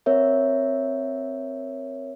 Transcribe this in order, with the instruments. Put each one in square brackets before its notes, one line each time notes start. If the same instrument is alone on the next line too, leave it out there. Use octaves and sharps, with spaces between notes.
[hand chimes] C4 A#4 C#5 E5